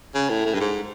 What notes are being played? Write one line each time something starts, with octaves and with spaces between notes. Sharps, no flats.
C#3
A2
A2
G2
G#2